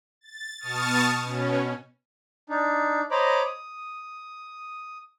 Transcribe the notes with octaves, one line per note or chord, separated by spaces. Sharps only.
A6
B2 A5 C#6 D#6 F6 A6
B2 C#4
D4 D#4
C5 C#5 D#5 A#5 B5 D6
D#6